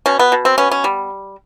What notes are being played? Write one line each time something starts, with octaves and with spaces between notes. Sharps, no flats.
B2 C#4
B3
B2
C4
B3 C#4
C#4
G3